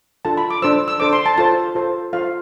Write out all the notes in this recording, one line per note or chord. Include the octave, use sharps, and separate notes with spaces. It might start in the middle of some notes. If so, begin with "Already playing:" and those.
D4 F4 A4 A5
B5
D6
D4 A4 C5 E6
E6
D4 A4 C5 D6
C6
A5
F4 A4 C5 A5
F4 A4 C5
F4 A4 C5 F5